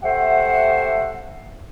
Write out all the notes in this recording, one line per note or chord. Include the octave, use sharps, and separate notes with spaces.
A3 G4 C5 E5 F#5